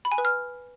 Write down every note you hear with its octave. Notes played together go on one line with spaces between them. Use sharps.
B5
G#5
B4
F6